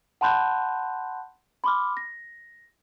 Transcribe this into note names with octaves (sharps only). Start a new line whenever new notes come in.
F#5 A5 B5 C6 F#6 G6
B5 C6 D6 F6
A#6